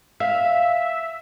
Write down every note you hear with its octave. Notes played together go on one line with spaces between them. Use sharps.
E5 F5